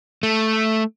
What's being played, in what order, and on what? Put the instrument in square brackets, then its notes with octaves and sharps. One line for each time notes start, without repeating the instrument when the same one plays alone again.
[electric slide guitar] A3